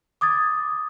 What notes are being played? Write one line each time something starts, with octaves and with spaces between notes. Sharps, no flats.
D6 D#6 G#6 A6